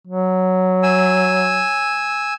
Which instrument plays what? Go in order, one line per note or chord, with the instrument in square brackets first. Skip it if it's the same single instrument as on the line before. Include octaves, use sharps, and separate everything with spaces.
[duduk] F#3
[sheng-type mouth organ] G#5 E6